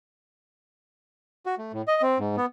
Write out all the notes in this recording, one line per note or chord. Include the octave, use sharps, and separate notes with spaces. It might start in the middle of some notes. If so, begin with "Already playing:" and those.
F#4
A3
A2
D#5
C4
G#2
B3